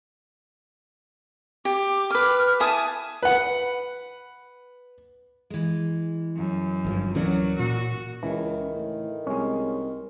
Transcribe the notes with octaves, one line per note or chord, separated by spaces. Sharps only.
G4 D6
B4 D6 F6
E4 G#5 A5 D#6
B4 F#5
E3 G#3
F#2
G1 G2 F3
D1 E3 F#3 C#4 A#4 D5 F#5
A#2 F#4
C#2 D#3 E3
A2
C2 G#3 C#4